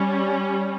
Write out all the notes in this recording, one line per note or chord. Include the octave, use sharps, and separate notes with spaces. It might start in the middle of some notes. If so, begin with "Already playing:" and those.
Already playing: G3 C#4